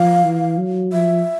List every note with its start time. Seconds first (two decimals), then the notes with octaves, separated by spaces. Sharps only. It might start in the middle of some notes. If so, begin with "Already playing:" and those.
Already playing: F3 F5
0.24 E3
0.58 F#3
0.93 F3 E5